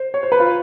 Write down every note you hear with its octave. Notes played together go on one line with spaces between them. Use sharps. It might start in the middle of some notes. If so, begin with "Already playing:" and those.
Already playing: C5
C#5
C5
B4
F4